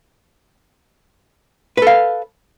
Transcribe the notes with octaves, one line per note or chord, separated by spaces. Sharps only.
A4 B4 F5